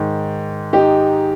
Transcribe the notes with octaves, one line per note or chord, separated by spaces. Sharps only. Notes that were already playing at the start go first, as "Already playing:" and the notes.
Already playing: G#2 D#3
D#4 G4